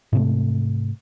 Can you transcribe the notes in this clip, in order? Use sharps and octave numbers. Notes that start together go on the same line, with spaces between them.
G#2 C3 A3